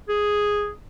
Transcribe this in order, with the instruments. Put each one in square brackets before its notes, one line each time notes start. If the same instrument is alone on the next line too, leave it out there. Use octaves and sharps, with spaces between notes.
[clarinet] G#4